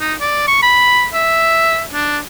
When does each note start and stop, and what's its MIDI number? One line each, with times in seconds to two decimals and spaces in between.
0.01 0.14 63
0.21 0.45 74
0.48 0.60 85
0.63 1.07 83
1.14 1.82 76
1.93 2.18 62